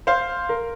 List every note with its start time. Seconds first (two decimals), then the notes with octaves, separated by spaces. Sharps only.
0.07 C5 F5
0.49 A#4